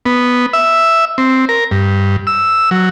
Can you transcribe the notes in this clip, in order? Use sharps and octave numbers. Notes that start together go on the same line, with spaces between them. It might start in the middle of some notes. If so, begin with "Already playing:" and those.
B3
E5
C4
A#4
G2
E6
F#3